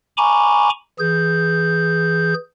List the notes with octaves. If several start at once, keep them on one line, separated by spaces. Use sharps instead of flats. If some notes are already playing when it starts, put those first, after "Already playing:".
G#5 A#5 B5 C#6 D6
E3 G#4 G6